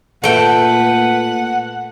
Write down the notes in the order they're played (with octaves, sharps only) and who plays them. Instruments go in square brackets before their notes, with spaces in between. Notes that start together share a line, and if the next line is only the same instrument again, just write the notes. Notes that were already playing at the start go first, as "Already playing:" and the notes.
[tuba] A#2 [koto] A3 G5 [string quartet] B4 [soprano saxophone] F#5